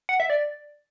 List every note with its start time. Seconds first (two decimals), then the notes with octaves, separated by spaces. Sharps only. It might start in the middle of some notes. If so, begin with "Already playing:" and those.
0.09 F#5
0.20 E5
0.30 D5